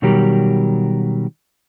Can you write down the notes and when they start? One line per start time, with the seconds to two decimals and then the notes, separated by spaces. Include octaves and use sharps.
0.02 B2 D#3 F#3 G3 G4 A#4